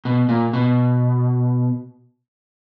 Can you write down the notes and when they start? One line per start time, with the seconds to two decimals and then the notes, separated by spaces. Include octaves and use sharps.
0.05 B2
0.29 A#2
0.53 B2